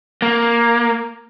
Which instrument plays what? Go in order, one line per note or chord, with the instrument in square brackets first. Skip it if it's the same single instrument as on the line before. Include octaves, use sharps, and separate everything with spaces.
[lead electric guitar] A#3